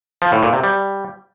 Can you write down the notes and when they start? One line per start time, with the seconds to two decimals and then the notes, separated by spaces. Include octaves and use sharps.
0.22 F3
0.32 A2
0.43 A#2
0.53 C3
0.64 G3